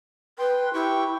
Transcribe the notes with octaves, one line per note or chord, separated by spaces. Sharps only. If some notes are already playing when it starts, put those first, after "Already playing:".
B4 G5 C6
E4 G4 G5 C#6